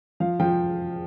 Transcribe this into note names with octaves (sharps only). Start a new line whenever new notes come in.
F3 F5
F3 G5